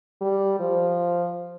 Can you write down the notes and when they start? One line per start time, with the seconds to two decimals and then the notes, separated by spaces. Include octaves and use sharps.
0.21 G3
0.60 F3